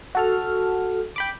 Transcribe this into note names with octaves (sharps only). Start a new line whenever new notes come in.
F#4 A4 F6
G5 B5 D6